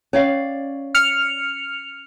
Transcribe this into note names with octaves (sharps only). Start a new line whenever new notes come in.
C#4 C#5 D5 F5
F6 C#7 F7